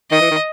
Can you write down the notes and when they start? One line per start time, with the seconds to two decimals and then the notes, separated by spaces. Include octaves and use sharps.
0.11 D#3 D#5
0.21 E3
0.31 D#3